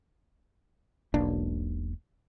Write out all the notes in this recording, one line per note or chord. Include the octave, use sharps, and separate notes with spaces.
E1 B1 A#3 D4